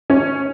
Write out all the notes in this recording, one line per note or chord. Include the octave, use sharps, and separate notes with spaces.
C#4